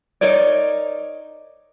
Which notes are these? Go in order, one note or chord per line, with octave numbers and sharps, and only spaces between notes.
D#4 A#4 C#5 D5